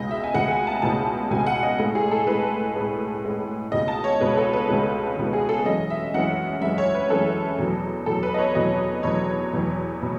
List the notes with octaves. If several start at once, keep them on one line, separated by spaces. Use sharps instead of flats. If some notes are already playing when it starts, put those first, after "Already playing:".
Already playing: C#2 B2 G#3 D#5
E5
G#5
C#2 B2 G#3 F#5
G#5
A5
C#2 B2 G#3 A5
C#2 B2 G#3 G#5
F#5
D#5
A2 G#3 A4
G#4
A4
A2 G#3 B4
A2 G#3
A2 G#3
C#2 B2 G#3 D#5
A5
C#5
C#2 B2 G#3 B4
A4
B4
C#2 B2 G#3
C#2 B2 G#3
G#4
A4
F#2 E3 G#3 D#5
E5
F#2 E3 G#3 F#5
F#2 E3 G#3 E5
C#5
B4
F#2 E3 G#3 A4
E2 B2 F#3
E2 B2 F#3 A4
B4
D#5
C#5
E2 B2 F#3 D#5
E2 B2 F#3 C#5
E2 B2 F#3
B2